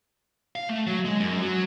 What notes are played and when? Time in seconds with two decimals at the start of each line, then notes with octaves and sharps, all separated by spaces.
0.56 F5
0.69 A3
0.87 F#3
1.05 G#3
1.20 F#2
1.42 F#3